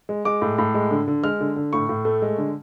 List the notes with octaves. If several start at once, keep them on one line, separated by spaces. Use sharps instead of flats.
G#3
G#3 D6
A2
A2
G#3
D3
D3
G#3 F6
D3
D3
A2 C#6
A2
A3
G#3
D3